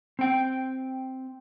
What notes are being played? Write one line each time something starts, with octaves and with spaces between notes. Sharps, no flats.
C4 G5